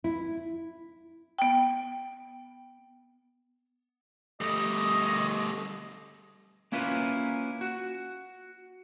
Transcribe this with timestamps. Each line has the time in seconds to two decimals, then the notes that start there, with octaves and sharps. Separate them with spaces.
0.04 E4
1.38 B3 G5
4.41 G3 A3 D#5
6.72 A#3 C#4 E4 F4 B4
7.61 F#4